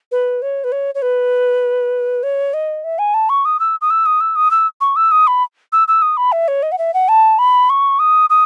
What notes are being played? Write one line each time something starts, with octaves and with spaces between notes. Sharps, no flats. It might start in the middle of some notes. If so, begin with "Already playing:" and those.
B4
C#5
B4
C#5
C#5
B4
C#5
D#5
E5
G#5
A5
C#6
D#6
E6
D#6
E6
D#6
E6
D#6
E6
C#6
E6
D#6
B5
E6
E6
D#6
B5
E5
C#5
D#5
F#5
E5
F#5
A5
B5
C#6
D#6
D#6